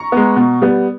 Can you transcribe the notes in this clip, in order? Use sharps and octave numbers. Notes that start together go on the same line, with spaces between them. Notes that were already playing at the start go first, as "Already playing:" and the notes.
Already playing: A#5 C#6
G#3 B3
B2
G3 B3